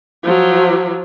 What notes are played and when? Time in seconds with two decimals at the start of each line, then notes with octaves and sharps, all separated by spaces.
0.23 F3 F#3